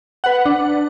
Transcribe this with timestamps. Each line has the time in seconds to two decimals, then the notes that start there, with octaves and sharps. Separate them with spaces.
0.24 B4 F#5
0.46 D4